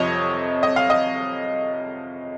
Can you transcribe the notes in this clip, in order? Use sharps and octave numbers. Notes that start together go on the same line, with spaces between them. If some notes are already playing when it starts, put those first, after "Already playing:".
Already playing: F2 C3 F3 C#5 D#5
D#5
F5
D#5